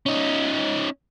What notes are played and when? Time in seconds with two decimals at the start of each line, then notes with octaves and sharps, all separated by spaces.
0.06 C#4 D#4